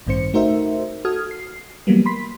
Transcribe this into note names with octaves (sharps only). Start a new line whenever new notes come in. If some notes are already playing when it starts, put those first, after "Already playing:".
A1 G2 D#3 C4 C5 C#7
A3 D#4 F#4 A#4 C5 E5
F#4 A4 D#6 F6 G#6
C7
E3 F#3 G3 A#3 B3
B5 C6 B6